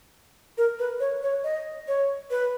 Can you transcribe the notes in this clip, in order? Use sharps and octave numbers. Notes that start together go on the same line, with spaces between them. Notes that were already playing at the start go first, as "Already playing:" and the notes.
A#4
B4
C#5
C#5
D#5
C#5
B4